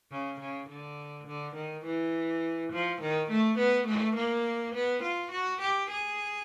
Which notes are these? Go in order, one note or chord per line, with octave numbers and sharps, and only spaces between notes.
C#3
C#3
D3
D3
D#3
E3
F3
D#3
A3
B3
A3
A#3
B3
F4
F#4
G4
G#4